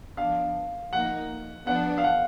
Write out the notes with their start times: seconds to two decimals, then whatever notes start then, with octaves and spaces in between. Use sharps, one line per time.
0.17 F3 B3 D4 F5
0.92 F3 A#3 D#4 F#5
1.67 F3 B3 D4 F#5
1.98 F5
2.04 F#5